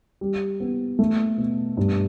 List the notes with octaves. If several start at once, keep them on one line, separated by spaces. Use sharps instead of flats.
G3
B3
A3
B2
G2